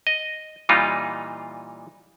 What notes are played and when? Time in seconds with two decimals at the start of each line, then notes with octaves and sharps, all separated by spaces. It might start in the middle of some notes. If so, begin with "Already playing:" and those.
0.07 D#5
0.69 A#2 E3 G3 D#4 F4